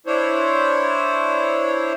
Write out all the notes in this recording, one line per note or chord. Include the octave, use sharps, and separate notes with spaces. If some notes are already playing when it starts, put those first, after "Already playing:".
D4 E4 C5 C#5